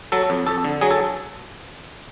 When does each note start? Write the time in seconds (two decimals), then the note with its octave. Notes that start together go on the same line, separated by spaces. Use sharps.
0.12 F#3 A4
0.30 F2
0.47 F2 A4
0.65 D3
0.81 F#3 G#4
0.91 A4